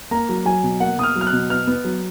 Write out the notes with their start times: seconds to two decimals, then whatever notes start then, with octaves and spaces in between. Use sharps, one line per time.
0.11 A#3 A#5
0.29 F#3
0.45 F#3 G#5
0.63 B2
0.80 A#3 F#5
0.98 B2 D#6
1.03 F6
1.16 F#3
1.21 F6
1.27 F#6
1.33 B2
1.50 B3 F6
1.67 B3
1.84 F#3